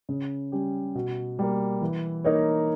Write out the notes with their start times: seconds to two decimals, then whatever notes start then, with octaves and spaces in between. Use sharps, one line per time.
0.09 C#3
0.52 G3 C#4 G4
0.95 B2
1.39 G3 A#3
1.82 E3
2.24 A#3 D#4 A#4 C#5